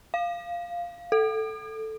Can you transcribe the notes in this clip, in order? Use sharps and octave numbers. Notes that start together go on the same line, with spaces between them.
F5
A4